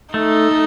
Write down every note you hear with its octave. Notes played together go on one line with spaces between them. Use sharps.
A3 D#4
A3